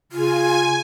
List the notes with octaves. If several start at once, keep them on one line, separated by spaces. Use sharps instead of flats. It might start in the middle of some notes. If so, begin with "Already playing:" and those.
C#3 F4 G#5